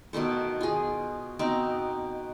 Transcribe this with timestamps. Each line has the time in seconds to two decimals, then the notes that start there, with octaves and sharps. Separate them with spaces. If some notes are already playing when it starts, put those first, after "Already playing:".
0.13 B2 D#3 A3 C5
0.61 F4 G#4
1.39 B2 C4 D#4 A#5